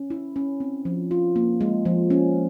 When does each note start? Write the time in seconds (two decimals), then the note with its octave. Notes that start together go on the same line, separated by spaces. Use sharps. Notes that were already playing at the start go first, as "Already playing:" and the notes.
Already playing: C#4
0.10 E4
0.36 C#4
0.60 C4
0.85 F3
1.11 F4
1.36 A#3
1.61 G#3
1.85 F3
2.10 C#4